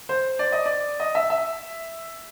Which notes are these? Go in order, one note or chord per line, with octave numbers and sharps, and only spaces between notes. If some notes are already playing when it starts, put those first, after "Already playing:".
C5
D5
D#5
D5
D#5
E5
E5